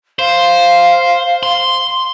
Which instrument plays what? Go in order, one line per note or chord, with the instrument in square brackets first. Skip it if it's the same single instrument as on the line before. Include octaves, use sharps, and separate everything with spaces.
[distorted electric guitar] C5 [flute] F5
[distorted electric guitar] C6